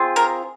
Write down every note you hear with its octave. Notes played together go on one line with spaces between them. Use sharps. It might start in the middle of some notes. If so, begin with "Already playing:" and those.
Already playing: C4 F4 G#4
A#4